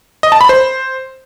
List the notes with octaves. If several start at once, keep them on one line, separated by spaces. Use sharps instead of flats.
D#5
A5
B5
C5